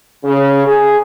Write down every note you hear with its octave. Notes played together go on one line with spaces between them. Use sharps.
C#3
G#4